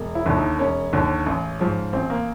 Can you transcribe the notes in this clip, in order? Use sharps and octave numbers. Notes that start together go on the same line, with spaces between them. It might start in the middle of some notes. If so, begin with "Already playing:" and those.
Already playing: E1
E4
D#2 D3
D#4
E1 C#4
D#2 D3
A1
G#2 F3 G#3
A1 C4
A#3